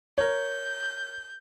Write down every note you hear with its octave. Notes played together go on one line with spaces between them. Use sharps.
A#4 C#5 G6